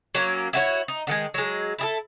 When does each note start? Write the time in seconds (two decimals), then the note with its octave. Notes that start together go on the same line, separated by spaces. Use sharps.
0.15 F#3 A#3 C#4
0.53 E4 F#4 C#5
0.88 D#4
1.07 D3 D#3 G#3
1.34 F#3 G#3
1.79 E4 G#4 A4